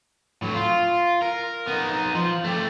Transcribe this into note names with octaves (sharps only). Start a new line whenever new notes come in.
A2 F#3
F4
A#4
B3 D#4
F3
A3 G4